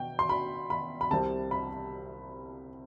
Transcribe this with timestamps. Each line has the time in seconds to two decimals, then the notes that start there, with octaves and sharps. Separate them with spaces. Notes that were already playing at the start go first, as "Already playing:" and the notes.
Already playing: B2 G5
0.19 C6
0.29 B5
0.70 B5
1.01 B5
1.11 C2 C3 G3 C4 A5
1.51 B5